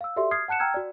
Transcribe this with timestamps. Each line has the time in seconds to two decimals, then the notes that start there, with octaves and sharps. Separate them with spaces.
0.01 F5 E6
0.16 F#4 G4 A4 D5 E5 C6
0.31 D#6 F6 G#6 C7
0.48 F#5 A5 F#6 C#7 E7
0.60 G5 A#5 E6 F6 G#6
0.74 F#4 D5